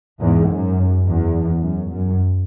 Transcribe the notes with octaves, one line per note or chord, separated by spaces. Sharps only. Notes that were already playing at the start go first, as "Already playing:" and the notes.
E2 G#2
F#2
E2
F#2
F#2